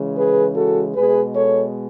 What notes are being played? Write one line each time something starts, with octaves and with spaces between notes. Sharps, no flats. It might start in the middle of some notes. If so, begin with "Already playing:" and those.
Already playing: C#3 E3 G#3
G#4 B4
F#4 A4
B2 G#3 G#4 B4
A4 C#5